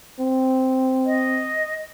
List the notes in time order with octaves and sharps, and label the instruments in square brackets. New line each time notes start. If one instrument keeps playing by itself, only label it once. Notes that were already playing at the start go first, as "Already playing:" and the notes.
[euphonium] C4
[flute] D#5